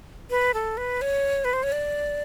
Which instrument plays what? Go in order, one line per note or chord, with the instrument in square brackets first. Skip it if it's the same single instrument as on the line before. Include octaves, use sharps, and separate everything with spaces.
[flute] B4
A4
B4
C#5
B4
C5
C#5
D5